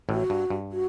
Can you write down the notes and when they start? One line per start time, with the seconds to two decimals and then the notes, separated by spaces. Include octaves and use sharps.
0.09 A1 A2 F#4
0.30 G2
0.50 G2
0.72 F#4